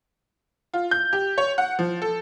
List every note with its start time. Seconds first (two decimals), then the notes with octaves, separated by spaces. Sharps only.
0.74 F4
0.91 G6
1.13 G4
1.38 C#5
1.58 F#5
1.79 F3
2.02 A4